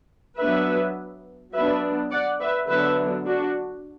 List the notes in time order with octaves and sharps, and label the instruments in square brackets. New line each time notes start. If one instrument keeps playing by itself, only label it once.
[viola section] F#3 B3 D4 B4 E5
F#3 B3 D4 B4 E5
D5 F#5
B4 E5
D3 F#3 B3 D4 B4 E5
D4 F#4